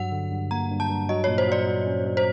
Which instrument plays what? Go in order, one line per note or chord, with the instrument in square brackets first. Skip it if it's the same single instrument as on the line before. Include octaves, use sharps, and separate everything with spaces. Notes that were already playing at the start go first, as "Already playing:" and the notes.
Already playing: [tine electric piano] G2 F#3 [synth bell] F#5
[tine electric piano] D3
G2
[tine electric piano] A#3 [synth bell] A#5
[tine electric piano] G2
[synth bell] A5
[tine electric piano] G2
[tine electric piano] F#3 [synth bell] D#5
[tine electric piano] A#2 [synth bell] C#5
[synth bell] C5
[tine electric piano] F#3 [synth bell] D5
[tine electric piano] F#3
C#4
F#3
[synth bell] C5